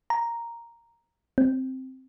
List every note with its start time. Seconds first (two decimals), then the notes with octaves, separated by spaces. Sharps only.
0.10 A#5
1.38 C4